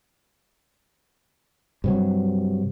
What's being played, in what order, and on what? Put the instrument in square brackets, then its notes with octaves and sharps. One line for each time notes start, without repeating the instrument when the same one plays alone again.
[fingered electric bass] G2 C3 F#3